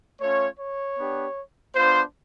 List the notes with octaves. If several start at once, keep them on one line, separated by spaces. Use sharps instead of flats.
A3 C#4 F4 C#5
C#5
B3 D4 G4
B3 D4 F4 C5